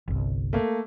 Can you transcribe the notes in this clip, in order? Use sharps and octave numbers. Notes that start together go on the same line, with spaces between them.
G1 C2
A3 A#3